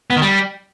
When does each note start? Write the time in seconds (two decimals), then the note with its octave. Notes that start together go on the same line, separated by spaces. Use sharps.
0.10 B3
0.16 D#3
0.22 G3